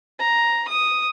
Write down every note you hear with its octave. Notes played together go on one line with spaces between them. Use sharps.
A#5
D#6